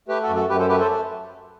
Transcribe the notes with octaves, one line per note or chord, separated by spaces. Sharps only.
A3 G4 B4
F#4 A4
F#2
F#4 A4
F#2 G4 B4
A4 C5
A3 G4 B4
A4 C5